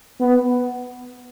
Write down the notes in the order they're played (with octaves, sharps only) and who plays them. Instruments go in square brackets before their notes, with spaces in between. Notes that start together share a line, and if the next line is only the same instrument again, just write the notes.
[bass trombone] B3